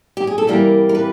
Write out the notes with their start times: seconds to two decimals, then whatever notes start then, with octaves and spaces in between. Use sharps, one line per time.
0.17 G4
0.27 G#4
0.38 A4
0.47 C3 E3 G3 A#3 A#4
0.89 A#4
0.95 B4